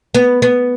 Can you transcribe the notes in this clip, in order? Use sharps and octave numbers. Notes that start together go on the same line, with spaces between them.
B3
B3